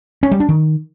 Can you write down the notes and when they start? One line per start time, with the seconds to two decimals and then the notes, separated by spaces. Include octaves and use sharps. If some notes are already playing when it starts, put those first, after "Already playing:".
0.23 C#4
0.31 G3
0.40 D4
0.49 D#3